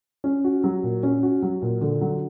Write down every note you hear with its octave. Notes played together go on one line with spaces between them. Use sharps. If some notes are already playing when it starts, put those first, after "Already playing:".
C#4
F#4
F#3
A#2
C#4
F#4
F#3
A#2
D3
F#3